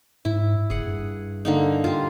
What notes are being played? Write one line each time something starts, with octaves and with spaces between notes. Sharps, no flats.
G#2 E4
F#1 G#4 F#5
G2
D3 A#3 D#4
G3 F4